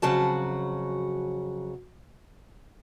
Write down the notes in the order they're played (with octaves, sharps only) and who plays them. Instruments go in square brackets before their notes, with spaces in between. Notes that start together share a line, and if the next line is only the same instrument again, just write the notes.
[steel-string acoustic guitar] F2 C#3 F#3 F#4 A5